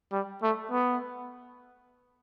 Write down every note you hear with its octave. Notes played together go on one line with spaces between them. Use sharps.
G3
A3
B3